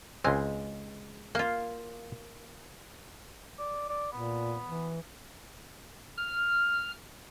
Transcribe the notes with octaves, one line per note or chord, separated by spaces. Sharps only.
C#2 G#3 C4
A#3 F4
D5
D5
A#2 B3
E3
F6